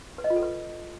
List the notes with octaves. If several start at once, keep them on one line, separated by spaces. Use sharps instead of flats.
B4
D#5
F4
A4
B4